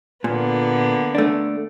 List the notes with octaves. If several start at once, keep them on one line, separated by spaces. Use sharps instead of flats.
A#2 D3 A#3 B3
A3 D4